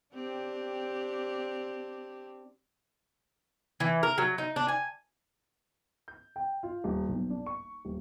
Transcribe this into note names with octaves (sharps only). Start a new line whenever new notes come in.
C4 D4 G4
E3
A#4
F#3
D#4
D4
G#5
G6
G5
F4
D#1
B1
D4
C#6
D#1